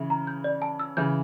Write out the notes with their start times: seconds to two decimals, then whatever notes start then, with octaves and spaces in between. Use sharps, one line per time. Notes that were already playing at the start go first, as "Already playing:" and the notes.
Already playing: C#3 E3 E5
0.10 A#5
0.27 G6
0.44 D5
0.62 A5
0.80 E6
0.97 C#3 E3 G6